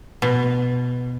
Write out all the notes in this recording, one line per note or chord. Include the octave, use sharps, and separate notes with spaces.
B2